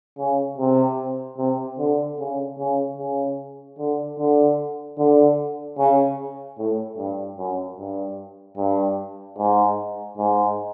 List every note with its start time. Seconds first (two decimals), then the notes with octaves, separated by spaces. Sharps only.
0.18 C#3
0.58 C3
1.38 C3
1.79 D3
2.19 C#3
2.58 C#3
2.98 C#3
3.78 D3
4.18 D3
4.98 D3
5.78 C#3
6.58 A2
6.98 G2
7.38 F#2
7.78 G2
8.57 G2
9.38 G#2
10.18 G#2